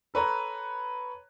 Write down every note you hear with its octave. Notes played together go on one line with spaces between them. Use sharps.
A4 B4 C#5 A#5